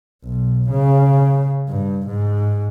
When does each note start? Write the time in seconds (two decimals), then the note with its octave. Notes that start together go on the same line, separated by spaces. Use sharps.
0.24 B1
0.70 C#3
1.68 G2
2.07 G#2